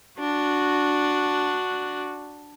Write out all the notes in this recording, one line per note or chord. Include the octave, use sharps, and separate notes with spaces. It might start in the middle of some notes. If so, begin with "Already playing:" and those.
D4 F#4